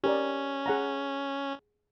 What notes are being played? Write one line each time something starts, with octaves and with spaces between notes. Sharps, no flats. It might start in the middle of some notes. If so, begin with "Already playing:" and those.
C#4 G4 A#4 D5
G#4 F#5 A#5